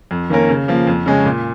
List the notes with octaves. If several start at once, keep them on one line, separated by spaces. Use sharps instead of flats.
F2
D#3 A#3 C#4 A#4
C#3
F3 A#3
F2
C#3 G#3 C#4
A#2